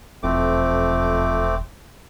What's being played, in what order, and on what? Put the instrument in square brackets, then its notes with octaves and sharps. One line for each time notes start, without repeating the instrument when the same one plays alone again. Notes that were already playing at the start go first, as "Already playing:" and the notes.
[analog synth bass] E1 [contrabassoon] F2 [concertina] A3 C4 D6